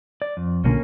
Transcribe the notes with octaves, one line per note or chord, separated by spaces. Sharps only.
D5
F2
B1 A#2 D3 A#3 C#4